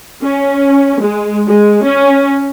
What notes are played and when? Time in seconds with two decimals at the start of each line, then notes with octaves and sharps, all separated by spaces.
0.23 C#4
1.01 G#3
1.48 G#3
1.85 C#4